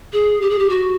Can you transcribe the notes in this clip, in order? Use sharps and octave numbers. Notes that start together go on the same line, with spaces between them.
G#4
G4
G#4
G4
F#4